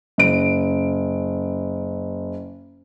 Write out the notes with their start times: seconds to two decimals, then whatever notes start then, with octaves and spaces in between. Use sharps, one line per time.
0.18 F#1 D7